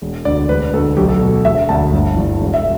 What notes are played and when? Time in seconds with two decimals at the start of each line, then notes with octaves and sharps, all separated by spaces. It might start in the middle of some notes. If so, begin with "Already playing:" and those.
0.02 E1
0.25 D2 D3 D5
0.49 E1 B4
0.74 D2 D3 A4
0.97 B1 G4
1.09 A4
1.21 B2
1.45 E1 E5
1.69 D2 D3 A5
1.94 G1
2.17 G2 E3
2.41 E1
2.54 E5